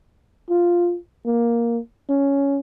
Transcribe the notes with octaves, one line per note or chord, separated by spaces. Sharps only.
F4
A#3
C#4